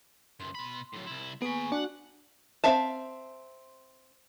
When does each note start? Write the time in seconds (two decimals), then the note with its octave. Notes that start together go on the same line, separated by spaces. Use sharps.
0.40 C#2 F#2 C6
0.55 B2 B5
0.94 A2 F#3
1.07 C2 E4
1.42 A#3 B3 G#4 G#5 B5 C#6
1.72 D4 F#4 F#5
2.64 C4 E5 F5 A5